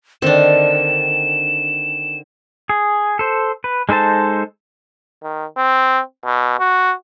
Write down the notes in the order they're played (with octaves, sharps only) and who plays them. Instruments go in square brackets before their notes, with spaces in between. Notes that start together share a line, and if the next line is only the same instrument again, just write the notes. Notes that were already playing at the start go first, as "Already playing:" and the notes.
[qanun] D3 C4 [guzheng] D#3 D4 [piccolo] E7
[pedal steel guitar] G#4
A4 C5
B4
G#3 D#4 A4 C5 A5
[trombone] D#3
C4
B2
F#4